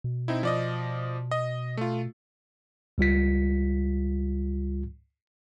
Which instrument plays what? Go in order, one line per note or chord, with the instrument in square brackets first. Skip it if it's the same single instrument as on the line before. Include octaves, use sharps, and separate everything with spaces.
[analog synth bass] B2
[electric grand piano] C4 D#4 E4
F3 D5 D#5
D#5
A3 F4
[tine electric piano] C#2 G3 F4 B6